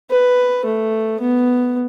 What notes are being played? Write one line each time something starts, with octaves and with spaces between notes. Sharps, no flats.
B4
A3
B3